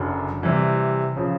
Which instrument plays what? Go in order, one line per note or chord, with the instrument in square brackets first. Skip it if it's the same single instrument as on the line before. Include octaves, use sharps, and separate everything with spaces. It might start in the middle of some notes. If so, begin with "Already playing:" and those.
Already playing: [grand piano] F#1 F#2 D3
C3 E3 G3
C#3 F3